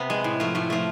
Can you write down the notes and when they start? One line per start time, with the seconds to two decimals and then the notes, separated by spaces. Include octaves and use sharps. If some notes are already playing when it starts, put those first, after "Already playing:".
Already playing: C3 B3
0.10 G#3
0.24 A2
0.40 F3 A3
0.55 A2 A3
0.70 F3 A3